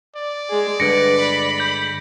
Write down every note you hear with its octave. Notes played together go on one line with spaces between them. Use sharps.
D5
G#3 G#4
G2 D3 G#3 B4 A#6 C#7 D7
B5
G6